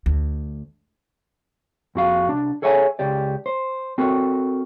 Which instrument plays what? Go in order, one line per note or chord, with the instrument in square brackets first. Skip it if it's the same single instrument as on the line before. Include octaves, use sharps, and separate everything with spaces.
[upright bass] D2
[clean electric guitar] F2 F#4 F5
C2 D4
G#4 A4 C#5 E5 G5 G#5
C#2 G4 D5
C5
C4 F#4 A4 A#4